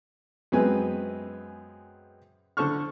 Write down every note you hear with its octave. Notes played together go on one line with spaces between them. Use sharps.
F#2 G#3 B3 C4 B4 G#5
D3 C5 A5 C#6 F6